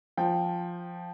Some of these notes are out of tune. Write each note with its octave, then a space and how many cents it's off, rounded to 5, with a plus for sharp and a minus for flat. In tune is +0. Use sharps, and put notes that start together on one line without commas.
F3 +0 G5 +0